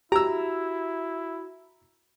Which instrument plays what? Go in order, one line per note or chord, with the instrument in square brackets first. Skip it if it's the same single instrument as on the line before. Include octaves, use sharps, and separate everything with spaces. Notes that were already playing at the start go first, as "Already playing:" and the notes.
[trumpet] E4 [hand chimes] F#4 [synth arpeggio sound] G4 [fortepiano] A#5 E6